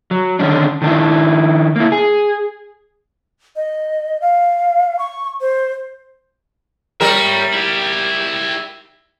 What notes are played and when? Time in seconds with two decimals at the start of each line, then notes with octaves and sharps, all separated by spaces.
0.11 F#3
0.39 D3 D#3 C#4 D4
0.82 D#3 D4 E4
1.76 A#3 E4
1.92 G#4
3.56 D#5
4.21 F5
4.99 C#6
5.41 C5
7.01 G3 A#4 C#5 E5
7.53 E4 G4